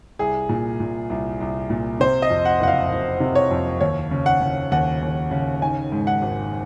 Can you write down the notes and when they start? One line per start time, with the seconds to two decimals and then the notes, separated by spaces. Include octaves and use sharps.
0.19 C2 G#4
0.49 A#2
0.80 A#2
1.10 C2
1.41 C2
1.70 A#2
2.00 C3 C5
2.22 D#5
2.30 F2
2.45 F#5
2.60 F#1 F#5
2.67 F5
2.91 F#1
3.20 C3
3.35 C#5
3.51 F2
3.81 D#2 C#5
4.11 C#3
4.26 F#5
4.41 C#3
4.71 D#2 F#5
5.02 D#2
5.31 C#3
5.62 D#3 G#5
5.92 G#2
6.07 F#5
6.22 G#1